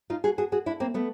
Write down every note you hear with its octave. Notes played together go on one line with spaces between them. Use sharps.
D#4 F4
F#4 G#4
F#4 G#4
F#4 G#4
D4 E4
A#3 C4
A3 B3